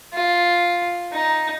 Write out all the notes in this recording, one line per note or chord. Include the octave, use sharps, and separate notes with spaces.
F4
D#4